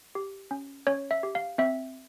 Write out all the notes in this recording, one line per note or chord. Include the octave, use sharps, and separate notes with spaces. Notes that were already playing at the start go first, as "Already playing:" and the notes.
G4
C#4
C#4 C#5
E5
G4
F5
C4 E5